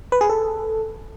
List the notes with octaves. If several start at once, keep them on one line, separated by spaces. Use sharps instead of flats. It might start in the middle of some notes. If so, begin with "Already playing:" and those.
B4
G#4
A4